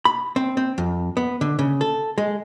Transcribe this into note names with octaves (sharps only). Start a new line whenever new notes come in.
B5
C4
C4
F2
B3
D3
C#3
A4
G#3